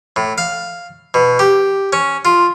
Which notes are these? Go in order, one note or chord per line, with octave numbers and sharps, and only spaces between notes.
A2
F5
B2
G4
C#4
F4